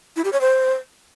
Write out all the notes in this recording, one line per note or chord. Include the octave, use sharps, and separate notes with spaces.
E4
G4
C#5
C5